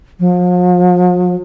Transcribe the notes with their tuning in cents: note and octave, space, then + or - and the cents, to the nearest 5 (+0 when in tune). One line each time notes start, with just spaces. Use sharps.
F3 +45